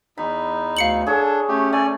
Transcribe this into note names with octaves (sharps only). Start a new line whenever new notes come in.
E2 D#4 B5
D2 F5 C#7 F#7
D4 G#4 A4 C#5
A3 C#4 G4
A3 D5 G#5